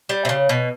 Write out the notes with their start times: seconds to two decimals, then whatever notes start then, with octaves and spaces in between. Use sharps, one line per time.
0.09 G3
0.25 C3
0.29 C#3
0.49 B2